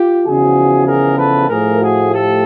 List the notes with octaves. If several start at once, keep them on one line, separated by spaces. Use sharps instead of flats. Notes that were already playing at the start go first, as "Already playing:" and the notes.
Already playing: F4 G4
E2 C#3 F3 F#4 G#4
G#4 A#4
A4 B4
A2 F3 A3 G#4 A#4
F#4 G#4
G4 A4